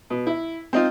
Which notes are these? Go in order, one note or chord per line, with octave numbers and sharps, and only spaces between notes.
B2
E4
C4 D#4 F4